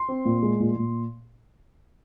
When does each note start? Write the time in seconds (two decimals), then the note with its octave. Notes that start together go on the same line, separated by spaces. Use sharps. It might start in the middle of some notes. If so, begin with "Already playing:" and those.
Already playing: C6
0.08 C4
0.25 A#2
0.43 G#3
0.60 A#2
0.76 A#2